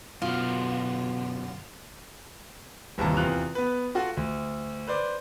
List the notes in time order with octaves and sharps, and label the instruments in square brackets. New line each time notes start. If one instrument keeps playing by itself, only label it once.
[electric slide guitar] F#2 D3 F#4 [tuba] B2 [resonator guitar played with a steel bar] F4
[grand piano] G1 D#2 C3 E3 A5 A#5
E2 C3 C4 F4 F#6 F7
B3 B4
F4 F#4 A4 F#5
D2
B4 C5 D5